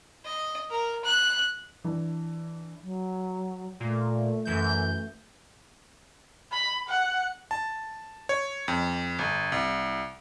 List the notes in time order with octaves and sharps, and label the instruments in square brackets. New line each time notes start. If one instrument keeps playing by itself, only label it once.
[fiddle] D#5
A#4
F#6
[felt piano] E3 D4
[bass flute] F#3
[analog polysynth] A#2 [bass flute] A3
[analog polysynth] F#2 E3 G6
[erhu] B5
F#5
[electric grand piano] A5
C#5
F2
G1
C2